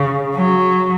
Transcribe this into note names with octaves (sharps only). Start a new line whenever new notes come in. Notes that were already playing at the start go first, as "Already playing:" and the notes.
Already playing: C#3
F#3